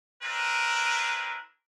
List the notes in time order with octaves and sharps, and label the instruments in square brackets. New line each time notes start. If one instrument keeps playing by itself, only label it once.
[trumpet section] C4 D4 E4 A#4 B4